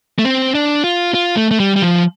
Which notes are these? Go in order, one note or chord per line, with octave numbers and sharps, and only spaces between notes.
A3
C4
D4
F4
F4
A3
A3
G3
G3
F3